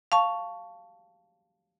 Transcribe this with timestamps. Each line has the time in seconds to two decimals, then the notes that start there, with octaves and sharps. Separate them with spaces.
0.12 F5 A5 C#6